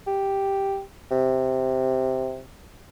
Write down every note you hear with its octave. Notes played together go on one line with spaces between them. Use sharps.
G4
C3